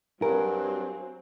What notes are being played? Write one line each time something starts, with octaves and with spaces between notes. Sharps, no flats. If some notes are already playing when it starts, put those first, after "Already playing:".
G2 F#3 C4 A#4 F#5 G#5